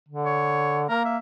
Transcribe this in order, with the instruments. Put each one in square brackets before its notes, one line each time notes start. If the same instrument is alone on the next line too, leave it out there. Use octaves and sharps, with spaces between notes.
[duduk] D3
[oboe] C#5
[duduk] A#3 [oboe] A#4
[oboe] E5